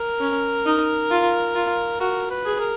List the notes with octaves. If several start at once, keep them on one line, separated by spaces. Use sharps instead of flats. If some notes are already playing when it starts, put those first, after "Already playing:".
Already playing: A#4
C#4
D#4
F4
F4
F#4 A#4
B4
G#4
A#4